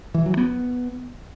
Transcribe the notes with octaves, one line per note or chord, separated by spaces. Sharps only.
E3
F#3
B3